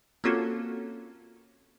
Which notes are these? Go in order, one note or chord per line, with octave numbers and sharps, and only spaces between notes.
A#3 C4 C#4 F4 F#4 A4